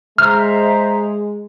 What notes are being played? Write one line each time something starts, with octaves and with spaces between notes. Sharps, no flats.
G#3 C5 E5 A#5 F6